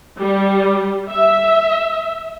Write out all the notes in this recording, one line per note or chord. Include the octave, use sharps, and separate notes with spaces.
G3
E5